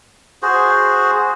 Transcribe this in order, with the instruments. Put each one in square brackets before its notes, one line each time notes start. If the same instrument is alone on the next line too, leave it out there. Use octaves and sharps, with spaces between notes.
[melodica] F#4 G#4 C5